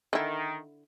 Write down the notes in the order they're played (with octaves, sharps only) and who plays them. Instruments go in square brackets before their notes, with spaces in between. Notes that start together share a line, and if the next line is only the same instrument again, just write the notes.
[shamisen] D3 E4 [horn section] D#3